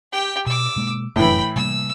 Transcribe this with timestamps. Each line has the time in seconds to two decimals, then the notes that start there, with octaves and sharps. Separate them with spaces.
0.12 G4 G5
0.46 B2 D6 E6
0.76 B2 G#3 A#3
1.16 F1 F#2 A2 E3 G5 B5
1.56 C3 G3 A#3 E6